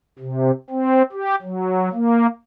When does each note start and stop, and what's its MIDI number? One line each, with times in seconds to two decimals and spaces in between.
0.19 0.51 48
0.70 1.02 60
1.12 1.35 67
1.42 1.89 54
1.93 2.27 58